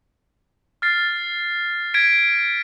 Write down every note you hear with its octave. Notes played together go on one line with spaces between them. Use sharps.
F6 A6 C7
G#6 B6 D7